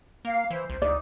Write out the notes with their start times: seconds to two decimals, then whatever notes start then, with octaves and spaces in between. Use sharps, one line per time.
0.25 A#3 F5
0.50 E3 C5
0.70 C2
0.82 C#2 D#4 D5